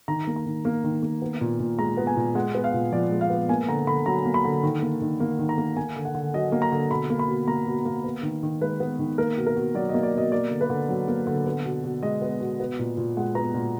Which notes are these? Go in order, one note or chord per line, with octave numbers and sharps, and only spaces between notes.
D#3 A#5
A#3
A#5
D#3
A#3
D#3
A#3
B3
A#2
A#2
G#3 A#5
B3
G#5
A#2
G#3 F#5
B3
F5
A#2
F3 D5
G#3
F5
B3
A#3 G#5
D3 A#5
D3 B5
F#3 A#5
A#3
B5
D3
D#3
A#3
D#3
A#3
D#3
A#5
A#3
A#3 G#5
D3
F#5
D3
F#3 D#5
A#3
A#5
D3
B2 B5
A#3
B5
B2
A#3 A#5
B2
A#3
B3
D#3
D#3
G#3 B4
B3
D#3
A#3 A#4
B2
A#4
B2
F#3 D5
D#5
A#3
D5
B2 D#5
A#3 D5
D3
B4
D3
F#3
A#3
D3
B3
B2
B2
G#3 D#5
B3
B2
B3
A#2
A#2
G#3 F#5
B3 A#5
A#2